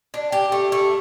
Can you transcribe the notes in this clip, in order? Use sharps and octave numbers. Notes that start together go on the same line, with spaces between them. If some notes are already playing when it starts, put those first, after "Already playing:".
D4
G4
A3
A3